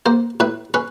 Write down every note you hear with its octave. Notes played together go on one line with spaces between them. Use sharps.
A#3 C5
A2 B4
C#4 B4